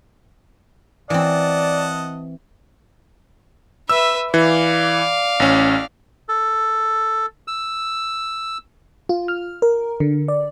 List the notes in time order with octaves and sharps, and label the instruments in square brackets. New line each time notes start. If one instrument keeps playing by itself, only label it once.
[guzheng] E3 C4 [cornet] D5 [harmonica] D#5 F#5 A5
[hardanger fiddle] B4 E5 [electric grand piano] E6
[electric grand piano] E3 [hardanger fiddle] D5 F5
[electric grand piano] A1 C#4
[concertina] A4
E6
[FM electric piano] F4
F6
A#4
D3
D5